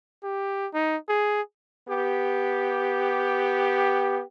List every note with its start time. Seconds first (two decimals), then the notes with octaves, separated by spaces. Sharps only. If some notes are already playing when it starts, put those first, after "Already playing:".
0.23 G4
0.74 D#4
1.09 G#4
1.88 B3 G4